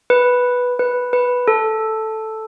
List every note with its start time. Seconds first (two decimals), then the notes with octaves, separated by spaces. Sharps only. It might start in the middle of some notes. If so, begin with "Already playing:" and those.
0.10 B4
0.79 B4
1.13 B4
1.48 A4